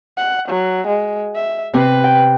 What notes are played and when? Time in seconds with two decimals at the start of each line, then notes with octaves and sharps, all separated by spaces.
0.17 F#5
0.48 F#3
0.86 G#3
1.35 E5
1.73 C3 C4 B4
2.04 G5